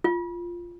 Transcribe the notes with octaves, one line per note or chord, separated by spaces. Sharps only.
F4